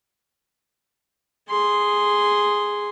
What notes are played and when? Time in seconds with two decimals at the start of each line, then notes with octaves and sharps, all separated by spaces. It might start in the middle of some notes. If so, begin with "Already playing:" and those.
1.49 G#4 C6